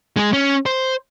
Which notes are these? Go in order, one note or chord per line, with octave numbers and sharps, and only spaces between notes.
G#3 G#4
C#4
C5